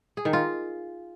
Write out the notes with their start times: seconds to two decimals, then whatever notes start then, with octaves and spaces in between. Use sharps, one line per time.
0.17 G#4
0.25 D#3
0.33 F4